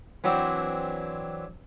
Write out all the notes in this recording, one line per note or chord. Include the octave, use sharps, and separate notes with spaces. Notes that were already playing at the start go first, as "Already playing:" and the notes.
E3 F#3 C4 D4